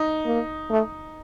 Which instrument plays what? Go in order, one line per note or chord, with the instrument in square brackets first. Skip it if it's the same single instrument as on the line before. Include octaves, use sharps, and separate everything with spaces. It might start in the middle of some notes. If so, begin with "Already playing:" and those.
Already playing: [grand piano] D#4
[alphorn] A#3
A3